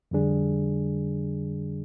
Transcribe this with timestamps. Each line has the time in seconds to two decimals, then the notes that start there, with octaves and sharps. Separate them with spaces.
0.11 F2 D3 G3 D4 G#4